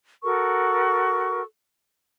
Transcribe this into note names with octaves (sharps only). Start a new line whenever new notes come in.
F#4 A4 A#4 C#6